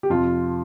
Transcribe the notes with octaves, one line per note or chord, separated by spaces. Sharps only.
G4
F2 C3 F3 F4